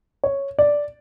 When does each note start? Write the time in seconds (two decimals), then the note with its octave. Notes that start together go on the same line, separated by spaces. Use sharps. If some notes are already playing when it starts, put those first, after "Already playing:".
0.24 C#5
0.59 D5